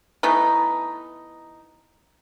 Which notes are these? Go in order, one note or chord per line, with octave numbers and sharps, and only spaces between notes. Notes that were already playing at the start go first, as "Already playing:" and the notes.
E3 A3 B3 D#4